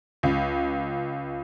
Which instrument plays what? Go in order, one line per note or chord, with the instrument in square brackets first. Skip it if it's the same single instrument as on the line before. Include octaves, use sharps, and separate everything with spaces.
[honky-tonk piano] C#2